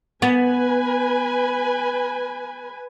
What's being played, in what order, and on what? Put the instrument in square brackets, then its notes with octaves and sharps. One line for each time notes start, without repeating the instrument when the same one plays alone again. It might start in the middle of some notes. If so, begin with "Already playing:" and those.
[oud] B3 [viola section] B4 G#5